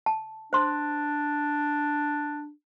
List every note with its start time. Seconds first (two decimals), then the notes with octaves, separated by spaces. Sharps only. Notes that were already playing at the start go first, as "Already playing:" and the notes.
0.06 A5
0.53 D4 C5 C6